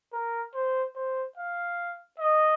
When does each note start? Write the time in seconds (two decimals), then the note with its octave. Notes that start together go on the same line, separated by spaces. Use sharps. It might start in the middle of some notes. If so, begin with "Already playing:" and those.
0.13 A#4
0.54 C5
0.95 C5
1.37 F5
2.20 D#5